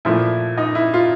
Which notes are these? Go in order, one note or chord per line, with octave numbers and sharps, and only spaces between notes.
A#2 F3 A3 E4
D#4
E4
F4